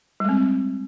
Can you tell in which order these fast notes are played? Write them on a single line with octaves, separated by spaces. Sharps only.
G3 G#3 C4